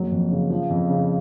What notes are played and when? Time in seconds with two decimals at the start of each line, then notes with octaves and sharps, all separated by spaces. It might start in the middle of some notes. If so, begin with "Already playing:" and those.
Already playing: F#1 F#3
0.12 F2
0.31 C#3
0.50 F3
0.70 F2
0.89 C#3